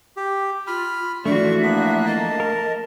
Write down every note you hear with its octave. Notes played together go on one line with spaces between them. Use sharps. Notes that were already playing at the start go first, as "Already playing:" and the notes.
G4
F4 B5 F6
E3 F3 A3 D4 F#4 E5 C#6
A#3 B3 D4 F#6
D#5 A5
A#4